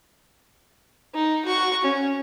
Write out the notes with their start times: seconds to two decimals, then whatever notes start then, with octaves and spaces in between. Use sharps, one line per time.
1.15 D#4
1.45 F#4 C#6
1.85 C#4